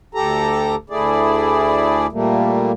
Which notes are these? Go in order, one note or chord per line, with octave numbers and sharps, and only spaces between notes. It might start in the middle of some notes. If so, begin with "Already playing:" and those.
D2 G4 A4 A#5
D2 A3 E4 G#4 D5
A#2 G3 A3 A#3